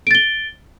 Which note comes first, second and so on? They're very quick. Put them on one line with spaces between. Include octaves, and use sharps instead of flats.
D7 A6 G7